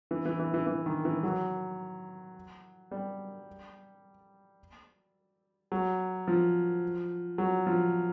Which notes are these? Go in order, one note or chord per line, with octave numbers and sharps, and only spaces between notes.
E3
E3
E3
E3
E3
D#3
E3
F#3
G3
F#3
F3
F#3
F3